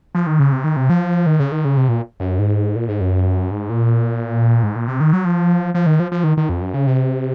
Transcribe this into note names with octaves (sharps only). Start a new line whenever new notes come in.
F3
D#3
C#3
C3
D#3
C3
F3
D#3
C#3
D#3
C#3
C3
A#2
F#2
G#2
A#2
G#2
F#2
G#2
A#2
G#2
A#2
C3
D#3
F#3
F3
F3
D#3
F3
F3
D#3
D#3
F2
F#2
C#3
C3